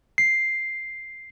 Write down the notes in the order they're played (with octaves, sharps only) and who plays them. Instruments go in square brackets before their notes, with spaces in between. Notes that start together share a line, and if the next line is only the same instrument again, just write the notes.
[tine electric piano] C7